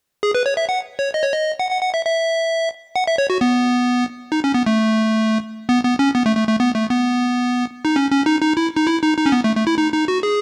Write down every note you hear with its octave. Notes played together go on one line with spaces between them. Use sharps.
G#4
B4
C#5
E5
F#5
C#5
D#5
C#5
D#5
F#5
F#5
F#5
E5
E5
F#5
E5
C#5
F#4
B3
D#4
C#4
B3
A3
B3
B3
C#4
B3
A3
A3
A3
B3
A3
B3
D#4
C#4
C#4
D#4
D#4
E4
D#4
E4
D#4
D#4
C#4
B3
A3
A3
E4
D#4
D#4
F#4
G#4